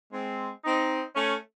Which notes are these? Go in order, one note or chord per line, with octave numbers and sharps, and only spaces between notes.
G#3 C4
C4 D#4
A3 C#4